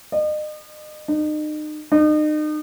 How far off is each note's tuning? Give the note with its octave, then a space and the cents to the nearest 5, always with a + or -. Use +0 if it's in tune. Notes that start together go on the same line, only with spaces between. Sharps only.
D#5 -40
D#4 -35
D#4 -35